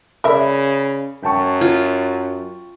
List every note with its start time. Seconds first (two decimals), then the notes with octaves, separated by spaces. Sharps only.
0.24 C#3 A#4 D5 E5 B5
1.23 F#2 G5 A5 C#6
1.61 F4